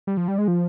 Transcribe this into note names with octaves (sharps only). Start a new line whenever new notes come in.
G3
F3
G3
G#3
F3